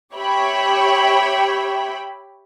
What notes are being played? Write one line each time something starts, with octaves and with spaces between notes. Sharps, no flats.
G4 C#5 E5 G5 B5